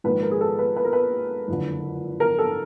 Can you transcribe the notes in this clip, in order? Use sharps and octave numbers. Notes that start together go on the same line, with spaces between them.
A#1 G#2 D#3 B4
A#4
G#4
A4
B4
B4
A#4
B4
F#1 F2 D3
A#4
A4